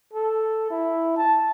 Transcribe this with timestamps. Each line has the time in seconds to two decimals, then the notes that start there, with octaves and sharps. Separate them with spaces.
0.13 A4
0.70 E4
1.17 A5